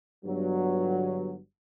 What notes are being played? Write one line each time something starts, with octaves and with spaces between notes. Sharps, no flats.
G1 G2 F#3